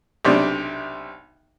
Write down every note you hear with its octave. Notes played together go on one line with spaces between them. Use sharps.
B1 C3 D4